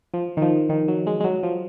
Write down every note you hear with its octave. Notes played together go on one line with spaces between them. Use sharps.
F3
D#3
F3
D#3
F#3
G#3
G#3
F#3
F3